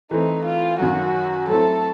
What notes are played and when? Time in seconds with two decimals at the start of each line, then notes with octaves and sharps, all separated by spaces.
0.11 E3 A3 C4 D#4
0.45 F4
0.79 F#2 D#3 F#3 F#4
1.48 F#3 A3 C4 E4 A4